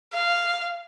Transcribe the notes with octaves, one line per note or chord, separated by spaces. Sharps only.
F5